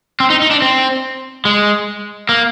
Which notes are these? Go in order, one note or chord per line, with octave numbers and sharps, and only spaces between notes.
C4
D#4
D#4
D4
C4
G#3
A#3